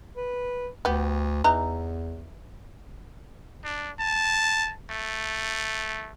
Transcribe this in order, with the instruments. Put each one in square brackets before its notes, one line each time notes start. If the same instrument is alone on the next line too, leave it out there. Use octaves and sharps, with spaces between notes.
[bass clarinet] B4
[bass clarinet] D2 [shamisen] B3 G4
[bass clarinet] E2 [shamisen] E3 D#4 A#5
[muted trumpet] D4
A5
A3